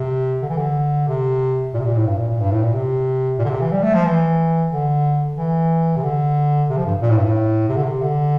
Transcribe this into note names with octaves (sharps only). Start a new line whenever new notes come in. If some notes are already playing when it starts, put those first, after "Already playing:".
Already playing: C3
D3
E3
D3
C3
A#2
C3
A#2
A2
G2
A#2
A#2
G2
A2
A#2
C3
A#2
D3
C3
E3
G3
A3
F3
E3
D3
E3
C3
D3
C3
F3
G2
A#2
A2
G2
A2
C3
D3
C3
D3